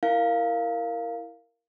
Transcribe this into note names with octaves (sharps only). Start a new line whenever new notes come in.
E4 A#4 F5